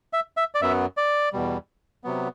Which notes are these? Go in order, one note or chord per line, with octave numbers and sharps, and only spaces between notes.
E5
E5
D5
F#2 F#3 B3 E5
D5
E2 B2 G3
C3 F#3 B3